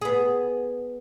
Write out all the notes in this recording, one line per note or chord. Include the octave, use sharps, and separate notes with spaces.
B3 G#4